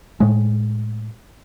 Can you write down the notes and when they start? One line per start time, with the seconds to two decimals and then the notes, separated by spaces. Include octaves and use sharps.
0.20 A2 G#3